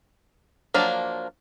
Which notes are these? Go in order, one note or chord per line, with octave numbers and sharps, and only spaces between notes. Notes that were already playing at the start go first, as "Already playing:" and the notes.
F3 F#3 A#3 D4